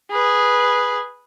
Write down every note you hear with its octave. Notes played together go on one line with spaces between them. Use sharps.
G#4 B4